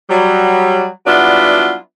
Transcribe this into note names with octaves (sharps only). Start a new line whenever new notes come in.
F#3 G3
F#3 G3 B3 D4 E4 F4